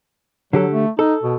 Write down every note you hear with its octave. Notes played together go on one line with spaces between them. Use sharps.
D3 F#3 G4 A4
A3
D#4 A4
B2